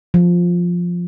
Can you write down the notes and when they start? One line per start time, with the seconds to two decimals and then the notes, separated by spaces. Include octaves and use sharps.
0.14 F3